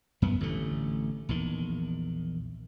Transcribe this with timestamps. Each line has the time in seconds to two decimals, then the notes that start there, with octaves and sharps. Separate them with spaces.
0.22 F#2 B3
0.41 A1 D3 A3
1.29 A#1 E2 D#3